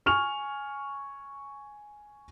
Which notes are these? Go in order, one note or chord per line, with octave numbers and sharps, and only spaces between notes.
G#5 C#6 F6 F7